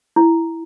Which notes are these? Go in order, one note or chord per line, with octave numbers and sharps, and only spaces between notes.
E4